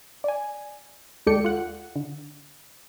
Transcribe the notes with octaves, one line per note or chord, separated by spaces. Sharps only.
D5 G#5
D#2 G#3 A4 D5 G5 C#7
F4 F#5
D3